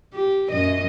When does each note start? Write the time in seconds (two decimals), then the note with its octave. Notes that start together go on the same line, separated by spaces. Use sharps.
0.14 G4
0.51 F#2 D#5